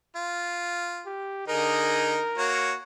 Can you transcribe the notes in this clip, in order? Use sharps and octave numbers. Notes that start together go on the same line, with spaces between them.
F4
G4
D3 D#4 G#4 A#4
A#3 F#4 C#5